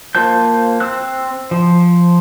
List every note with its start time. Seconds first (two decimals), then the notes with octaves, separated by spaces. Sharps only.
0.15 A#3 F4 C5 A5 G6
0.80 C4 E6 F#6
1.51 F3